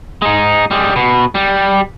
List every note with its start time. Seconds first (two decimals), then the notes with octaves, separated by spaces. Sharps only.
0.22 G#3 D#4
0.71 G3 G#3
0.96 B2
1.35 G3